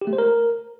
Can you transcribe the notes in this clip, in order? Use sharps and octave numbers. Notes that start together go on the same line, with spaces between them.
G4
A3
C5
A#4